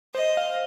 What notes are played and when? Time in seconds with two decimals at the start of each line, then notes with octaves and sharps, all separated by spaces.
0.14 C5 D#5
0.37 F5